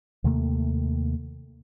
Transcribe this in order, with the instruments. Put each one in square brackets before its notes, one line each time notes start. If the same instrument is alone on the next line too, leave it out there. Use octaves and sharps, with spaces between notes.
[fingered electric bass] D#2 C3 A3 A#3